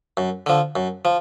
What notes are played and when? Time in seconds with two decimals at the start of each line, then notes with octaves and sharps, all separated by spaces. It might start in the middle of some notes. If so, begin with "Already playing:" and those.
0.17 F#2
0.46 D3 F3
0.76 F#2
1.05 F3